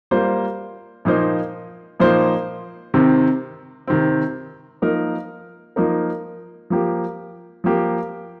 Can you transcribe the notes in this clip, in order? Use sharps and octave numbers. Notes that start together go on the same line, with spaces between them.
G3 A#3 F4 C5
A#2 F3 A#3 D#4 C5
A#2 F3 A#3 D#4 C5
C3 D#3 C4
C3 D#3 C4
F3 A#3 D#4 A#4
F3 A#3 D#4 A#4
F3 A#3 G4
F3 A#3 G4